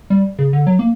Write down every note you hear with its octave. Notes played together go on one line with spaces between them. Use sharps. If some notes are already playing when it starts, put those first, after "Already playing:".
G3
C#3
D3
F#3
A#3